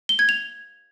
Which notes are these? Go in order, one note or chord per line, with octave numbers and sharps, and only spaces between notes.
G7
G#6
F7